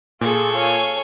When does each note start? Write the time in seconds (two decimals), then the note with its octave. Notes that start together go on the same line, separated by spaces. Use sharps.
0.21 A#2 F4 G#4 A4 C#6
0.55 C#5 F5 G#5